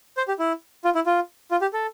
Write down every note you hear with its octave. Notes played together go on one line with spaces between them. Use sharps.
C5
G4
E4
F4
E4
F4
F4
G4
A4